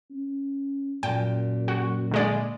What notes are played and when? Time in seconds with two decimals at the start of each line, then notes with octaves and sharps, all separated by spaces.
0.11 C#4
1.03 F#2 A#2 G5
1.68 F#4
2.11 D3 G#3 D5